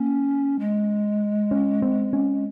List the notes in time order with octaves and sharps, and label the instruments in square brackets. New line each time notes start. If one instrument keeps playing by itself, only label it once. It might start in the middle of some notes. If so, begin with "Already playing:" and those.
Already playing: [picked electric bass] A#3 [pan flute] C#4
[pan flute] G#3
[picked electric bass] C#4
C4
C#4